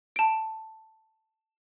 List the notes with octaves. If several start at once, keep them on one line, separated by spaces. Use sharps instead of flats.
A5 D7